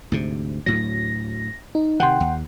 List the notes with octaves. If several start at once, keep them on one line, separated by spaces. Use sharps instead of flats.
D2 G#2 C3
D2 A2 F#3 A#6
D#4
C3 D#3 F#5 G5 C6
D#2